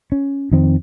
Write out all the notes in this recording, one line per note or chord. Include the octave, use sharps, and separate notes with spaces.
C#4
F2 D#3 C4